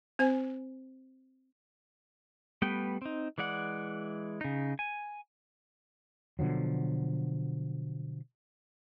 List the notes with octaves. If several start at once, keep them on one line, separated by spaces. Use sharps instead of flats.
C4 C5 G#5
G3 A3 B3 B4 G5
C4 D#4
E3 G#3 D5 F#5
C#3 D#4
G#5
B2 D3 F3 F#3